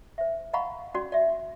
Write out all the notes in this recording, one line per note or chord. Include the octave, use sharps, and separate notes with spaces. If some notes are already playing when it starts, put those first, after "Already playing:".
C5 E5
D#5 F5 F#5 A#5 B5 C#6
C#4 F#4 D5 C6
D5 E5